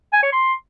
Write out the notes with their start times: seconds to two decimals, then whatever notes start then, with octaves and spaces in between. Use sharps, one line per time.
0.13 G#5
0.23 C#5
0.33 C6